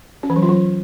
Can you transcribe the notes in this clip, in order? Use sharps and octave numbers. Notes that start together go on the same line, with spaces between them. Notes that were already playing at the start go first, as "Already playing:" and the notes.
C#4
E3
F#3
F4
F#3